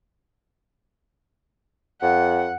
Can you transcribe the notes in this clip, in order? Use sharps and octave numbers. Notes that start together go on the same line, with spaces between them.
F2 F#5